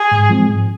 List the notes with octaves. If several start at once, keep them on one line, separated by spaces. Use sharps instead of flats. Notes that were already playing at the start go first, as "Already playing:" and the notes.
Already playing: G#4
G#2
F3 G#3 C4
G#2